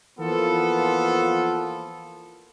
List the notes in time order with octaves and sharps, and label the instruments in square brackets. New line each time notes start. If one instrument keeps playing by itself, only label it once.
[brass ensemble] E3 F3 A#3 B3 F4 A4